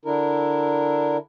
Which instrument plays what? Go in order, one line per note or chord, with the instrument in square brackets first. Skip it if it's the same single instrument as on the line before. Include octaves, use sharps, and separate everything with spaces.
[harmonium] D3 D4 E4 A#4